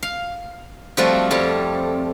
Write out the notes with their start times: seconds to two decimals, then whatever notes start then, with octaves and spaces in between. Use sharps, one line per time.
0.03 F5
0.97 F3 G3 A3 C4 F4 F#4
1.31 F2 G3 A5